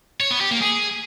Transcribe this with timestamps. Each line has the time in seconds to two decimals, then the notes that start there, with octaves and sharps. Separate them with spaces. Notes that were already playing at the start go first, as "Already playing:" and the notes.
0.21 C#5
0.31 B3
0.41 G4
0.51 A#3
0.61 G#4